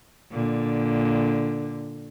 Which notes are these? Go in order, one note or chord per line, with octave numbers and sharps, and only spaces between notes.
A#2 D3